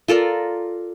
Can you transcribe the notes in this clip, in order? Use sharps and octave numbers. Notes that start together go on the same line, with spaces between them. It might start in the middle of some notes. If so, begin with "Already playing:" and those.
F4 A4 A#4 D5